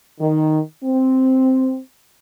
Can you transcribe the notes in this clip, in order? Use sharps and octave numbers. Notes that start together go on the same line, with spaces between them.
D#3
C4